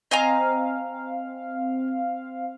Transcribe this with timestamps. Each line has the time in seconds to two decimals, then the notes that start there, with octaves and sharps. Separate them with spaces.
0.11 C4 D#5 F5 G#5 A#5